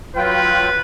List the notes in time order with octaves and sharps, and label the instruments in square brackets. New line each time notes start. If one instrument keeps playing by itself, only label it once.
[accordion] F#3 F4 G5 [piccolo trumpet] B4